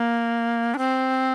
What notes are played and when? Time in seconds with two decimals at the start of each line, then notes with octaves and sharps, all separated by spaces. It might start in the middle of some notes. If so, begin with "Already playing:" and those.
Already playing: A#3
0.74 D4
0.78 C4